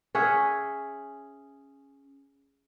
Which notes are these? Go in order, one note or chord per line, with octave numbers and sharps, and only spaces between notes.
C#4 G#4 E5 F#5